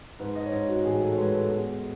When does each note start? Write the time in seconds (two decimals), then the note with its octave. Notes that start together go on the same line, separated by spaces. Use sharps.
0.19 G#2 B4
0.36 D#5
0.44 C#5
0.51 G#2 D#5
0.68 F#4
0.84 A1 G#4
1.00 A4
1.12 C#5
1.17 G#3 B4
1.34 A4
1.49 E2 G#4